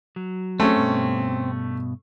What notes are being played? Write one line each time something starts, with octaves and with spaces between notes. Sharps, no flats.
F#3
A3 C4 C#4
G2 B2